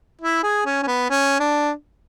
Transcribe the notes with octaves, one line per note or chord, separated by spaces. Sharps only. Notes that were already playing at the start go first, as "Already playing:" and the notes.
E4
G#4
C#4
C#4
B3
C#4
D4